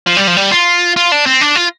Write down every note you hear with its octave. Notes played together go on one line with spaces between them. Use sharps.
F3
G3
F3
G3
F4
F4
D4
C4
D4
F4